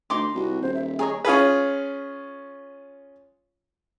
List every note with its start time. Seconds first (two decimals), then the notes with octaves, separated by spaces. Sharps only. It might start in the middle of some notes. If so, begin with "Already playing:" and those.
0.10 D2 D#4 C6 D6
0.35 C2 F#4
0.62 D#1 C5
0.74 E5
0.99 G#4 C#5 D#5 A#5
1.25 C#4 F4 G#4 B4